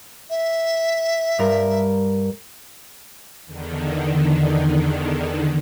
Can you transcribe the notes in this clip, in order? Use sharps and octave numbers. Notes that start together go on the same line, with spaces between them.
E5
G2 A#4
E2 D3 D#3